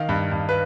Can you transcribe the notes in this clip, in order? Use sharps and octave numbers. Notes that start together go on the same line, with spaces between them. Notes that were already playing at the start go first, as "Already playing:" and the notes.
Already playing: D#3 F5
G2
G2
B4